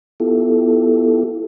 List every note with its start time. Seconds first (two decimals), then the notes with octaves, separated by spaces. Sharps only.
0.20 B3 E4 F4 G4 A4